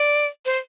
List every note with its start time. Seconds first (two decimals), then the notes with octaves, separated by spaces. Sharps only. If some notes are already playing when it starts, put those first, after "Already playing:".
Already playing: D5
0.46 C5